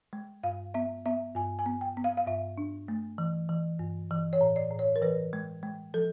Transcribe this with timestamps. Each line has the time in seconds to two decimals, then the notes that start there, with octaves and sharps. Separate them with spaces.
0.13 G#3
0.43 G2 F5
0.74 B3 E5
1.06 B3 E5
1.35 G2 G#5
1.59 G#5
1.66 B3
1.81 G5
1.97 B3
2.04 F5
2.17 F5
2.27 G2 E5
2.58 D4
2.88 A3
3.18 E3
3.49 E3
3.79 G2
4.11 E3
4.33 C#5
4.41 A2
4.56 D5
4.71 A2
4.79 C#5
4.96 A#4
5.02 E3 B4
5.33 G#3
5.63 G#3
5.94 F3 A4